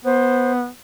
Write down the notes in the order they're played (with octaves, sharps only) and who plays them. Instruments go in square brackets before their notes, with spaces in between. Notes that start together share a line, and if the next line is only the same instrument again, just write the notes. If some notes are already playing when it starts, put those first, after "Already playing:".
[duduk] B3 [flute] C5